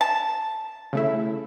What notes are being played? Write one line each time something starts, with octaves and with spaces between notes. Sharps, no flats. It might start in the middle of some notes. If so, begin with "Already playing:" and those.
A5
C#3 A3 E4